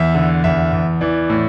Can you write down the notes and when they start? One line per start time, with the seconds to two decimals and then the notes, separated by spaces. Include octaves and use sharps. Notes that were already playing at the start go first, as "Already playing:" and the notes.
Already playing: E2 E5
0.15 D3
0.44 E2 E5
0.73 E2
1.01 E3 D5
1.30 A2